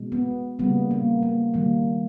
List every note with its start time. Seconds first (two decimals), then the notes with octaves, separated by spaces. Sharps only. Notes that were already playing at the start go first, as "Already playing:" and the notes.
Already playing: B2 G#3
0.12 B3
0.59 C#3 G3 A#3 B3
0.91 A#3
1.23 A#3
1.54 D#3 G3 A#3